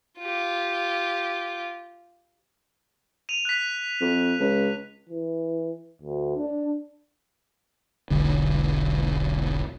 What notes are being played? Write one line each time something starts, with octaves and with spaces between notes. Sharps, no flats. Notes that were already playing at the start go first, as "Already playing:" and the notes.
F4 G4
D#7 F7
F#6 B6
F2
C#2
E3
D2
D4
E1 B1 D3